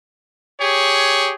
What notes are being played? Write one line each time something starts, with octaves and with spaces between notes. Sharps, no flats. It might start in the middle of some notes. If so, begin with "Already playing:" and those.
G4 G#4 C#5